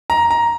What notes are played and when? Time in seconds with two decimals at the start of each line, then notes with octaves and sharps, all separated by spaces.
0.10 A#5
0.30 A#5